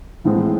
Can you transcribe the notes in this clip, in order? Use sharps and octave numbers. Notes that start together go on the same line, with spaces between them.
A1 A2 E3 G#3 C4